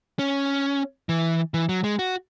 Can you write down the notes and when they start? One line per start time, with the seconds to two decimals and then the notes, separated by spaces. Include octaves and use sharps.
0.19 C#4
1.09 E3
1.54 E3
1.69 F#3
1.84 G#3
1.99 F#4